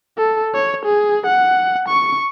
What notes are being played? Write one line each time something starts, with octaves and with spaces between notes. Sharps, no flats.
A4
C#5
G#4
F#5
C#6